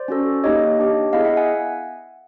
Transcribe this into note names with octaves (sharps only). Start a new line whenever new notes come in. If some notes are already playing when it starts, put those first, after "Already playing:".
Already playing: C5 D5
C#4 F#4 A4
A#3 D#4 G4 C#5 D#5
D4 G4
B3 E4 G#4 D#5 F5
E5 F#5
F#5 G#5